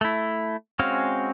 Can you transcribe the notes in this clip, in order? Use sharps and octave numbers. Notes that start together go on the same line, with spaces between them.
A3 E4
G#3 C4 C#4 F#4 F5